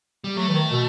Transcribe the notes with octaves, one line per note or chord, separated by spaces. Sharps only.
G3
F#3 A3
E3
D#3
B2